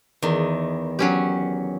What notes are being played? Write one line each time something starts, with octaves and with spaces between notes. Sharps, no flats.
E2 D#3
F#3 C#4 G4